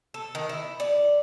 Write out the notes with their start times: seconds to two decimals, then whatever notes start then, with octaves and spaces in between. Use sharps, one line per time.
0.14 A4
0.35 D#3
0.49 E4
0.80 D5